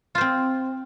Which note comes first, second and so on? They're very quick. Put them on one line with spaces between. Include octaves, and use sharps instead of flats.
F4 C5 C4